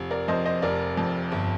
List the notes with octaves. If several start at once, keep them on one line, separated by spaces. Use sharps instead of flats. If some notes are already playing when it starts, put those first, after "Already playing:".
Already playing: F1
A#4 D5
F2 C5 D#5
C5 D#5
F1 A#4 D5
F2
G1